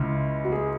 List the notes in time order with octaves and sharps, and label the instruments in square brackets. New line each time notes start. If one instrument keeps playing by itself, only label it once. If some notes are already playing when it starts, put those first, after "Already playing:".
Already playing: [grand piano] C#2 C#3 E4
F#4
G#4